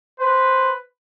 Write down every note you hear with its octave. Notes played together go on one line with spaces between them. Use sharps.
B4 C5